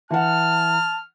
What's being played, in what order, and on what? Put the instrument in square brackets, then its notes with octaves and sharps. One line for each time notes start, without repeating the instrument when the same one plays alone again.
[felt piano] E3 F#5 [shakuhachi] A5 [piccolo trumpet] F6